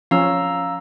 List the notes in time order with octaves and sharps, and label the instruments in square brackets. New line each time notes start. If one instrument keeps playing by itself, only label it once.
[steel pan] F3 C#4 [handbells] F5 A#5 E6